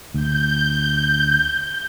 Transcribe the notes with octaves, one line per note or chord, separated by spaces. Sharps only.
D2 G6